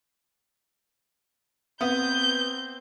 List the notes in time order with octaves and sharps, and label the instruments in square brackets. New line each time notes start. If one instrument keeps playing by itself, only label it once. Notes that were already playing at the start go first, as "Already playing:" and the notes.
[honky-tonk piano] B3 [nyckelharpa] C4 [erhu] G6